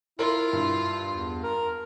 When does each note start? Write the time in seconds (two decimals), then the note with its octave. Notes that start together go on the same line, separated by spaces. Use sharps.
0.19 E4 F4 A#4
0.53 G2
1.10 E2
1.43 A#4